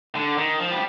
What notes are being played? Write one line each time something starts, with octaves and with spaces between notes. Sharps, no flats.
D3
D#3
F3
G3